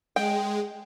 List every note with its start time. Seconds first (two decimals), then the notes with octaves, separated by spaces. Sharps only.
0.16 G#3 G5